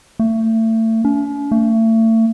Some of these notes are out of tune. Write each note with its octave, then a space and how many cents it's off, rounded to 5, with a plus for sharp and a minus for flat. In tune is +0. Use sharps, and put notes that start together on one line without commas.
A3 +30
C#4 +45
A3 +35